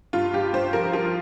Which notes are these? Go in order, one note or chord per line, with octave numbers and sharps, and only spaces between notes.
G2 F4
G2 G4
G2 C5
F3 A#4
F3 F4